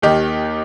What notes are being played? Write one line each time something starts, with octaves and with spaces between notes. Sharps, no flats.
D#2 D#3 D#4 G4